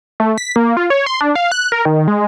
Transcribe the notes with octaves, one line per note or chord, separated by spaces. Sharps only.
A3
B6
A#3
F4
C#5
C6
D4
F5
F#6
A#4
D#3
G#3